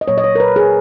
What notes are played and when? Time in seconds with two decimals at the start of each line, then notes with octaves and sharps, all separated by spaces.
0.01 D#5
0.08 A#2 F#3 A#3 C#5
0.18 D#5
0.24 C#5
0.35 A#4
0.40 B4
0.56 G#4